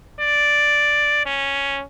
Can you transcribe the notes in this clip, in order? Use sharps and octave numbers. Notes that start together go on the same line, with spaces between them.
D5
C#4